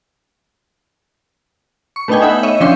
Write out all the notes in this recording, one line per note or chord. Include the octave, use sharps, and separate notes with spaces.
C#6
A3 B3 D4 D#4 G5 G#5
D#4 E5 F#5 B5
C#5 D#5 E5
F3 C#4 D4 G5 C6 C#7